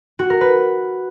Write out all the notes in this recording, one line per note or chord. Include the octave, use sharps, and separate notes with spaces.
F#4
A#4
B4